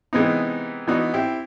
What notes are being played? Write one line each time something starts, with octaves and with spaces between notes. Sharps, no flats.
C3 E3 G#3 B3 C4 D#4
E3 B3 D4 D#4 F#4
C4 E4 G4